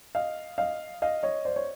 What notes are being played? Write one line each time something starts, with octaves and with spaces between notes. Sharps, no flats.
D#5 F5
D#5 F5
D#5 F5
C#5 D#5
C5 D5
C#5